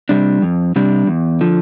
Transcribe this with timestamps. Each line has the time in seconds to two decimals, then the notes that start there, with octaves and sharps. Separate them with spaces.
0.09 C3 G3 D4
0.42 F2
0.76 C3 G3 D4
1.07 E2
1.41 D3 F3